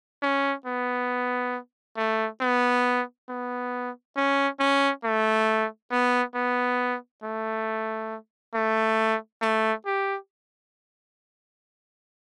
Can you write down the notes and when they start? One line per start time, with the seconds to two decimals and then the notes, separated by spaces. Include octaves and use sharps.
0.23 C#4
0.66 B3
1.97 A3
2.41 B3
3.29 B3
4.17 C#4
4.60 C#4
5.05 A3
5.92 B3
6.35 B3
7.24 A3
8.55 A3
9.42 A3
9.86 G4